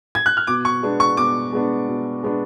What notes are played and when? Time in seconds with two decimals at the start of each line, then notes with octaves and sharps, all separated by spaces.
0.15 G#6
0.26 F#6
0.37 F6
0.47 B2 D6
0.65 C#6
0.82 G#3 B3 D4
1.00 C#6
1.17 B2 D6
1.52 G#3 B3 D4
1.88 B2
2.23 G#3 B3 D4